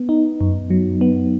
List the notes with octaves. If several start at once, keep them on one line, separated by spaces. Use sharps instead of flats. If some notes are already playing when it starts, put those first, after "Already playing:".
Already playing: B3
D#4
F#2
F#3
B3